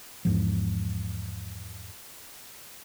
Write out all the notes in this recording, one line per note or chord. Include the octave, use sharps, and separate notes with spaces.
E2 G#2 F3